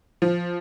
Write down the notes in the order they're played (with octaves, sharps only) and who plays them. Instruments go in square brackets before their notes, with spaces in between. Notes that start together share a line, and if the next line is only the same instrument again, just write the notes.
[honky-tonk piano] F3